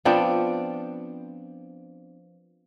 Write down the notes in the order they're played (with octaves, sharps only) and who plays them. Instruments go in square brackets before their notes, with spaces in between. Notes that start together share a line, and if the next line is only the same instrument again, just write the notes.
[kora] F3 B3 C4 D4